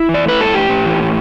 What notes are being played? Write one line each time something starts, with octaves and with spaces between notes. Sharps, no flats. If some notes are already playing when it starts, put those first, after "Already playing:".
Already playing: E4
E3
D5
A3 B4
G2 A4
A2 G4
A2
E3
A2